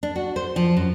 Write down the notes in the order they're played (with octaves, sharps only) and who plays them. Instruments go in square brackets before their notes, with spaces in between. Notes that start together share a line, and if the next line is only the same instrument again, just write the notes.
[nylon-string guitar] D4
F#4
C5
F3
F#2